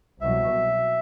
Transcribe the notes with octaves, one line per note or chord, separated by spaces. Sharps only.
C2 B2 F#3 E5